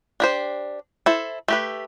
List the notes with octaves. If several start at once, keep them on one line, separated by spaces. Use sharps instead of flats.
D4 G4 C5
E4 A4 C5
A3 G4 B4